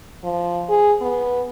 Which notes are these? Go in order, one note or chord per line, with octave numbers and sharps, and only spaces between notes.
F3
G#4
B3